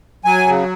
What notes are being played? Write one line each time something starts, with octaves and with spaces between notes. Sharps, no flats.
F#3 G#5
C#3